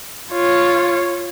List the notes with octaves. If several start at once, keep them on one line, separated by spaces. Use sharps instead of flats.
F4 C#5